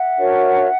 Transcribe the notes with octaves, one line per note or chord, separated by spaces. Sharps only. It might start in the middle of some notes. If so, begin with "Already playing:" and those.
Already playing: E5 F#5
D4 F#4 A#4 C#5